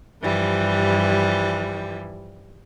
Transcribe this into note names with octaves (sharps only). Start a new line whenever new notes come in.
G2 E3 F3 G3